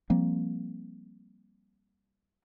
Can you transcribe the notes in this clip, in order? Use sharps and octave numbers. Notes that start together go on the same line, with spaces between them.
F3 G3 A#3 C4